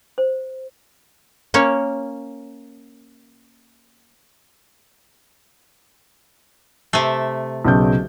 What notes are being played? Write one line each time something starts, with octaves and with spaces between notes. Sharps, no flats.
C5
A#3 C#4 C#5
C3 A3
B1 C#3 G6